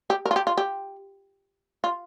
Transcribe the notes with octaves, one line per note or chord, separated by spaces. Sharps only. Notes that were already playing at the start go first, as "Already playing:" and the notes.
G4
A#4
F4
G4
F4
G4
F4